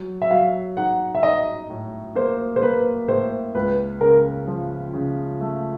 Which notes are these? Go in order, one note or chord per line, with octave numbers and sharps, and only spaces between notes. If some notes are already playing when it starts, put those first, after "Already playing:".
Already playing: F#3
E5
F#3 F5
D#4 F#5
E5
D#4 D#5
A2
A#3 C5
C5
A#3 B4
A2 C5
C#2 B4
C#3 A#4
F3
C#3
A3